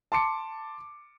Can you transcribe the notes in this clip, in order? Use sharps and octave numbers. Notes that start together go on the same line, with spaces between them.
A5 C6 D6 C#7